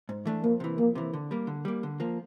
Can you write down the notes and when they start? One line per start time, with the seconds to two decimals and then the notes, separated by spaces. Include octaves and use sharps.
0.09 G#2
0.25 E3 A3 D4
0.43 F2 A#3
0.60 C3 E3
0.78 F2 A#3
0.95 C3 E3
1.13 D3
1.31 G3 A#3
1.47 D3
1.65 G3 A#3
1.83 D3
2.00 F3 A#3